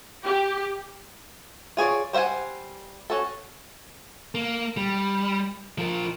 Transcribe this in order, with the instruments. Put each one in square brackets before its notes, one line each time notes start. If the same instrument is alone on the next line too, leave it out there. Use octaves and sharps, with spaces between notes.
[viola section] G4
[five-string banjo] F4 G#4 C#5 D5
G3 C5 E5 F#5 G#5
C#4 F#4 A4
[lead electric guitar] A#3
G3
F3 A#4